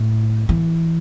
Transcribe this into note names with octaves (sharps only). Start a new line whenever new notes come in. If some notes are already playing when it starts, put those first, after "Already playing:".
Already playing: A2
E3